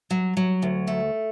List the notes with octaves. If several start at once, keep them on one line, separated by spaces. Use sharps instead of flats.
F#3
F#3
D2
A3